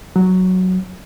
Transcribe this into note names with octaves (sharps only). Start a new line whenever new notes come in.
F#3